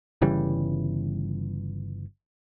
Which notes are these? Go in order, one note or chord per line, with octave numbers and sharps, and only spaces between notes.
G1 C#3 E3 G3